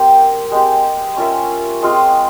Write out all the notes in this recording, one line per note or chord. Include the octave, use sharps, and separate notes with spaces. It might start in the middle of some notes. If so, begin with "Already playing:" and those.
Already playing: C4 G4 A#4
G#3 C4 G4
C#4 F4 A#4 E5
G#3 C4 F4 G#4